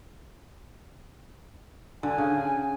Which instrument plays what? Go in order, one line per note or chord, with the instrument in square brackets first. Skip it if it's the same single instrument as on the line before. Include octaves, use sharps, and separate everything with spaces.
[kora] D3 [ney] G#5
[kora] C#3